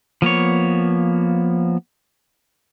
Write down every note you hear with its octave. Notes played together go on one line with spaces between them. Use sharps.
F3 A#3 B3 C#5